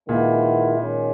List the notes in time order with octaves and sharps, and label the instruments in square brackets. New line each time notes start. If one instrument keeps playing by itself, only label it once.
[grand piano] A#2 [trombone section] D#3 G#3 B3 E4
[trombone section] D#3 G#3 C#4